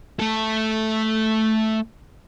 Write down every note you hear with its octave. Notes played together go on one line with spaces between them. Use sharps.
A3 A4